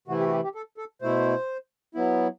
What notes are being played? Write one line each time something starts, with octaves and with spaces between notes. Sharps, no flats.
C3 E3 A3 E4 F#4
G4
F#4
G4
G4
A4
A4
B2 A3 E4 C5
F#3 B3 E4